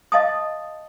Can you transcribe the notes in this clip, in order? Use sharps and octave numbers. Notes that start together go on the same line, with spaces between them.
D#5 F5 A5 D#6